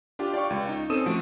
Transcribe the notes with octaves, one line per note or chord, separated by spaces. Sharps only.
D4 F4 G4
D5 F5 G5 C#6
C#2
D#4
C4 C#4 A4 D#6 D#7 E7
F3 A3 F#4 D7